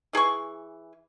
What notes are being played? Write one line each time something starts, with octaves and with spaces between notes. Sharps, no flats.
E3 G#4 B5 C#6